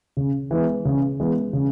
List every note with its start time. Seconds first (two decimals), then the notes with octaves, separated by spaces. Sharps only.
0.17 C#3
0.51 E3 G#3 B3
0.85 C#3
1.20 E3 G#3 B3
1.53 C#3